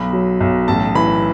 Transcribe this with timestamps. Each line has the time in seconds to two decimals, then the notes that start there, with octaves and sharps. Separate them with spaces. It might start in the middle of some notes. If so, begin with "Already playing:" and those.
Already playing: B1 B5
0.13 F#3
0.40 B1
0.68 A1 A5
0.95 E3 B5